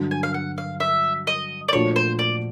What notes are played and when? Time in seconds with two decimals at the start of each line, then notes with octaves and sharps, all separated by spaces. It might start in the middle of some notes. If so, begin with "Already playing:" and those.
Already playing: G2 D3 F#3
0.11 G#5
0.23 F5
0.34 F#5
0.58 F5
0.80 E5
1.27 D#5
1.68 D5
1.73 A#2 F3 A3 D4 F#4 C#5
1.96 C5
2.19 D5